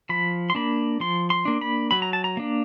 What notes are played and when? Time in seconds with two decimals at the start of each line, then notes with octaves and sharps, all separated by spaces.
0.09 F3 B5
0.50 C6
0.55 A#3 D4 B5
1.00 F3 C6
1.30 C6
1.45 A#3 D4
1.61 B5
1.91 F#3 B5
2.02 A#5
2.13 A5
2.24 A#5
2.37 A#3 D4